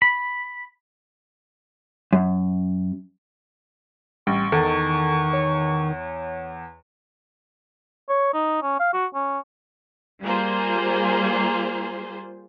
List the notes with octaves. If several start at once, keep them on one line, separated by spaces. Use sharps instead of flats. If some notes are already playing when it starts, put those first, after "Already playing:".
B5
F#2
A1 G3 C#6
E2 D#3 A4
C#5
C#5
D#4
C#4
F5
F#4
C#4
G3 A#3 F4 G#4 C5